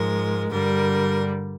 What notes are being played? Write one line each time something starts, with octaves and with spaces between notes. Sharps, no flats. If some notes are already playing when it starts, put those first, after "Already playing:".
Already playing: G#2 F3 G#3 A#4
G2 D3 G3 A#4